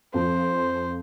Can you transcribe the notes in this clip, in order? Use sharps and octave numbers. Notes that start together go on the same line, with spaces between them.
F2 F3 C5